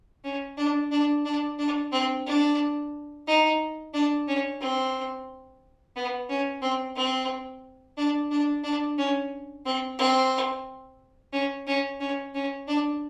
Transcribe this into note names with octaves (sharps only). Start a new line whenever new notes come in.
C#4
D4
D4
D4
D4
C4
D4
D#4
D4
C#4
C4
B3
C#4
C4
C4
D4
D4
D4
C#4
C4
C4
C#4
C#4
C#4
C#4
D4